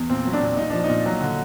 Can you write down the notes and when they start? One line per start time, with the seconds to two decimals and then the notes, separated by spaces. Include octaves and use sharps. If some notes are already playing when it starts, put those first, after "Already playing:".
Already playing: E2
0.10 A#2 C4
0.25 F#3
0.33 D4
0.41 A#2
0.57 A#2 D#4
0.70 F3 D4
0.84 D#4
0.90 A#2
1.06 F#3
1.21 D3